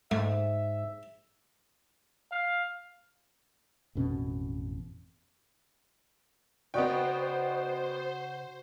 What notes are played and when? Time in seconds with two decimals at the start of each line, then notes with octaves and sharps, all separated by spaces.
0.11 G#2 A3 E5
2.32 F5
3.95 A1 F2 B2 C#4
6.74 C#3 B3 D#4 F#4 C5 D5 G5